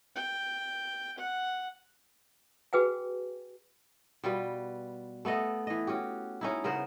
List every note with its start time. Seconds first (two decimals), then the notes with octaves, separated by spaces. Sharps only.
0.16 G5
1.18 F#5
2.73 F#4 G#4 B4 G5 G#5
4.24 B2 G3 F4 B4
5.25 A3 B3 A4 D#5
5.67 E3 D#5
5.87 C#4 F#4 G4
6.41 C#4 D#4 E4
6.64 C#3 B3 A#4 C5